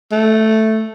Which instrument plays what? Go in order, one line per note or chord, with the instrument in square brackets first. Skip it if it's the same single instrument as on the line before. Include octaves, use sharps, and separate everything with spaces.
[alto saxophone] A3